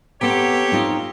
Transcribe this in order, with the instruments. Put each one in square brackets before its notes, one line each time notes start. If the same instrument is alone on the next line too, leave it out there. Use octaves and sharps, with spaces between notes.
[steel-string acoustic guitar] B3 C4 A#5 [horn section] G4 A4 C#5
[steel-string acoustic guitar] C4 D#4 F4